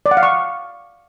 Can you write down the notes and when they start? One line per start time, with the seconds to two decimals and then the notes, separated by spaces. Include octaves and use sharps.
0.06 D5
0.11 F#5
0.17 F5
0.23 C#6